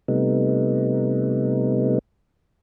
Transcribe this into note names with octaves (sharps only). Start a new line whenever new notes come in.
C3 G3 A3 B3 D#4